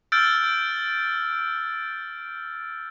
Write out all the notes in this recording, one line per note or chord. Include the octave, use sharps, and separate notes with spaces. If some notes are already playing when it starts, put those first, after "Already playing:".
E6 F6 G6 A6 D7